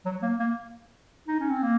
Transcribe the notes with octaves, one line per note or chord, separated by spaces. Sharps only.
F#3
A#3
A#3
D#4
C#4
C4
A#3